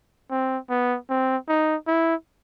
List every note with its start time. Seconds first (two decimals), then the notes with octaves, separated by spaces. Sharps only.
0.31 C4
0.70 B3
1.09 C4
1.48 D#4
1.87 E4